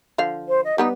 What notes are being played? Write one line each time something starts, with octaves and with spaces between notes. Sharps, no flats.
D3 F3 F5
C5
D#5
G3 B3 D#4 B4